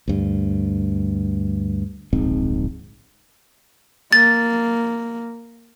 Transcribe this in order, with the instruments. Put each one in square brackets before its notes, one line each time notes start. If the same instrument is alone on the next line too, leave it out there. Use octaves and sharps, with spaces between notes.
[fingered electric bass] D2 G2
D1 A#1 G#2 C4
[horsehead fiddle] A#3 [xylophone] A6